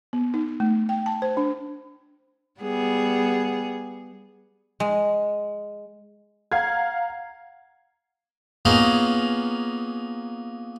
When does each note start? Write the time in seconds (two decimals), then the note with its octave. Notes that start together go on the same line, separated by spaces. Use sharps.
0.13 B3
0.34 D#4
0.60 A3
0.89 G5
1.06 A5
1.22 C5
1.37 D4
2.61 G3 B3 G#4
4.80 G#3
6.52 F5 F#5 A#5 G#6
8.65 A#3 B3 C#4 D#4 F4 G#4